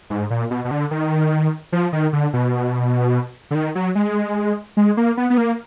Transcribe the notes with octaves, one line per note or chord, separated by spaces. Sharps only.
G#2
A#2
B2
B2
D3
D#3
F3
D#3
D3
B2
D3
D#3
F#3
G#3
G#3
A#3
B3
B3
A#3